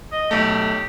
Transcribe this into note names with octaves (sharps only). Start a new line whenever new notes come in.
D#5
B1 A3 G4